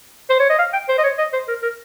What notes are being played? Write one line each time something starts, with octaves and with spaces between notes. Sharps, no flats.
C5
C#5
D#5
F5
G5
C5
D#5
C#5
D#5
C5
A#4
A#4